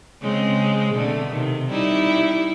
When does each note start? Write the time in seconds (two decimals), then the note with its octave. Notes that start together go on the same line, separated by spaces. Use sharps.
0.21 C#3 G#3 C4
0.93 B2 D3 A3
1.29 C3 D#3
1.70 G3 D#4 E4